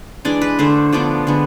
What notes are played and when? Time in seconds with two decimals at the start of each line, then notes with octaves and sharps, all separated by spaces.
0.25 E3 G#3 D4 D5
0.42 B4
0.59 D3 A3 D4 C5
0.93 F3 B3 D4 D5
1.27 D3 G#3 B3